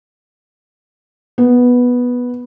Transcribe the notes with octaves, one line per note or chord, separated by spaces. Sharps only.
B3